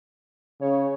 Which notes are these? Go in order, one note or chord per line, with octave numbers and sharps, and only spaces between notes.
C#3 C#5